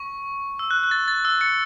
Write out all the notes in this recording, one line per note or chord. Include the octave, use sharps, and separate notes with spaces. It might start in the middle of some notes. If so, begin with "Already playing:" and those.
Already playing: C#6
E6
F#6
F#6
A6
A6
E6
A6 C#7